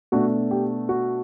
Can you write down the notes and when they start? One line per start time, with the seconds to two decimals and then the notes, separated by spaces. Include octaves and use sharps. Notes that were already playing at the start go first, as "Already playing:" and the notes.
0.12 B2 A3 D4 F#4
0.51 G4
0.89 F#4